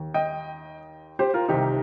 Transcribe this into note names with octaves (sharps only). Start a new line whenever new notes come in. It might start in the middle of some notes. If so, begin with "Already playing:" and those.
Already playing: D#2 D#3
D#5 G5
G4 C5
F4 A#4
C2 C3 D#3 D#4 G4